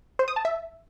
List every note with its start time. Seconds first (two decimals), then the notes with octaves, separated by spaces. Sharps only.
0.19 C5
0.28 D#6
0.36 A5
0.45 E5